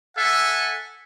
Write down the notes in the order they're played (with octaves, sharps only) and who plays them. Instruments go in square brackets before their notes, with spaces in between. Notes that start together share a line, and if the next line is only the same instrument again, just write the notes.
[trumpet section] A4 E5 F#5 G#5